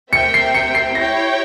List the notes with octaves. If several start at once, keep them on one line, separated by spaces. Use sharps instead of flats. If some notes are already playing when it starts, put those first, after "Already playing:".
C4 G4 A#4 E5 G5 C#7
C7
C#7
C7
E4 G4 C#5 G5 A#6